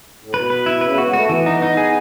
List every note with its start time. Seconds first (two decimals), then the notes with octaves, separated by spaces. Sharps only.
0.22 A2
0.33 B2 B4
0.50 B4
0.66 E4
0.81 C#3 B4
0.92 A3
0.98 B3 F#4
1.07 G#3
1.13 A3 F#4
1.29 E3 B3
1.46 D#4
1.62 D#4
1.77 G#4